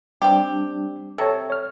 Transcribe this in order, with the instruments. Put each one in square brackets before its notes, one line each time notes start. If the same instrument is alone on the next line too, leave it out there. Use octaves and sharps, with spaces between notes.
[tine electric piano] G3 D4 [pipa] C4 G4
[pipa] C3 [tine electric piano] A4 C#5
[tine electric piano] C#5 F6